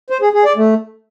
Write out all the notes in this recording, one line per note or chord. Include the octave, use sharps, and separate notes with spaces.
C5
G#4
G#4
D5
A3